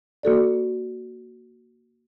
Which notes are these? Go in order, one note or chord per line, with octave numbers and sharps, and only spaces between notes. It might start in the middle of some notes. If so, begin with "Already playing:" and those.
A#3 F#4 A4 D5